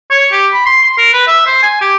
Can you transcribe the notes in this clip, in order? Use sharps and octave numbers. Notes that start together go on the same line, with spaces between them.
C#5
G4
B5
C6
C6
A#4
B4
E5
C5
G#5
G4